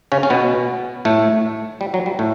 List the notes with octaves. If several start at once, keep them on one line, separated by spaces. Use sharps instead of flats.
C#3 C#4
C#4
B2 B3
A2 A3
G3
F#3
G3
A2 A3